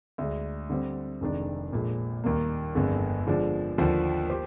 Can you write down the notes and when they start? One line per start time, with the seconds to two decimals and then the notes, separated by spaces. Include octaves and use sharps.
0.18 D2 D3 G#3
0.70 D3 G3 C4
1.21 F1 F2 D#3 G#3 D4
1.72 A#1 A#2 F3 G#3
2.24 D#2 D#3 G3 A#3
2.75 G1 F2 D3 G#3
3.27 D3 F3 G#3 D4
3.78 D#2 D3 F3
4.30 G4 C5